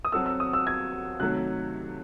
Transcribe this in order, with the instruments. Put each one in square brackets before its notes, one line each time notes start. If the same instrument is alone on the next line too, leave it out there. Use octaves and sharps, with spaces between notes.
[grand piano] D#6
[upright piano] F#3 C4 F#4 A4 [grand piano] E6
[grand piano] E6
D#6
E6
G#6
[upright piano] C3 D#3 F#3 A3 [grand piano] F#6